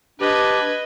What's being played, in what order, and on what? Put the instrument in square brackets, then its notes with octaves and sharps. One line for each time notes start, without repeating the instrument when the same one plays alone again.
[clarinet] D4 [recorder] G4 [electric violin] B4 [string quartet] D#5 G#6